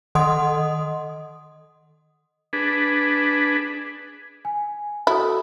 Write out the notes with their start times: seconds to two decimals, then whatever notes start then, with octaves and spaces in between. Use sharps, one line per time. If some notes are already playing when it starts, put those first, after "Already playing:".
0.15 D#3 A4 D#5 F#5 C6 D#6
2.53 D4 G#4 B4
4.45 G#5
5.07 E4 F#4 A4 D#6